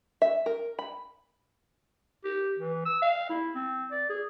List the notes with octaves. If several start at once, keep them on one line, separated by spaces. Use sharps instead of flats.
E5
A#4
B5
G4
E3
E6
F5
E4
C4
D5
G#4